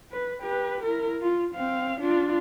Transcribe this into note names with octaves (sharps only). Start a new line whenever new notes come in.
B4
G4 B4
E4 A#4
F4
C4 F5
D4 F4